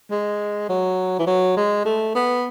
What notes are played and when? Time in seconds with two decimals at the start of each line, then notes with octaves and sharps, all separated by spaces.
0.11 G#3
0.69 F#3
1.19 E3
1.27 F#3
1.56 G#3
1.85 A3
2.15 B3